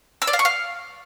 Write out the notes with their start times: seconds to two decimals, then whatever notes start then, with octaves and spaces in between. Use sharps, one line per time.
0.22 E6
0.27 D5
0.33 F5
0.39 C#6
0.45 F5